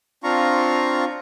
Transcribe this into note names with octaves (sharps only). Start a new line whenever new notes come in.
C4 D4 F4 F5 A#5 C#6